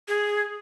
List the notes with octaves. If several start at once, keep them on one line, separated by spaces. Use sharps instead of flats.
G#4